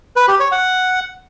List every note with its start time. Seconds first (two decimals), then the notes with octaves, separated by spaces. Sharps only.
0.16 B4
0.28 G4
0.40 C#5
0.52 F#5